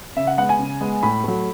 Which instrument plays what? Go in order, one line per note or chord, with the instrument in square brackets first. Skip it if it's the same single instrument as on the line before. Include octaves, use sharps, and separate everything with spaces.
[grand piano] C#3 E5
F#5
G#3 B3 F#5
G#5
C#3
G#3 B3
A2 B5
F#3 A3